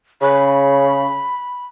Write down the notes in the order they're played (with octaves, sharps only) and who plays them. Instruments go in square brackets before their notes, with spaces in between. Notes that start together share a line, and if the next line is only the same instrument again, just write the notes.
[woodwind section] C#3 [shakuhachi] B5